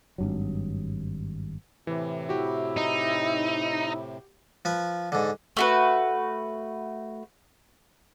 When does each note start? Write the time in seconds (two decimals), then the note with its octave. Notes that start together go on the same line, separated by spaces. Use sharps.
0.18 G#1 G2 F#3
1.87 A2 C3 E3
2.29 E4 F#4 G4
2.77 D#4
4.65 F3 B4
5.12 G#2 D3
5.57 A3 F#4 B4